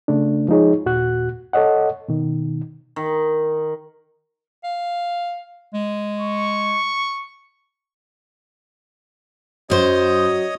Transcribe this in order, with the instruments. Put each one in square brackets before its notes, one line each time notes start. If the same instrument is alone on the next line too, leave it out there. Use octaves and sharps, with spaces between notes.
[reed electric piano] C#3 A3 D4
F3 G#3 D#4 G#4 C#5
D#2 A#2 F#4 F#6
A4 C#5 D#5 F#5
B2 D#3
[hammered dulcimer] D#3
[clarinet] F5
G#3
[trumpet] C#6
[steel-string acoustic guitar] F#2 C5 [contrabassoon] F#3 [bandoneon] C#5 D#5 D#6